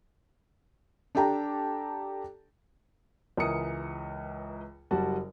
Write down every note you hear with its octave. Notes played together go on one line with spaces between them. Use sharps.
D4 G4 A4 G5 A5 A#5
C#2 E3 A#4 D#6 C#7
F#1 G3 F#4 A5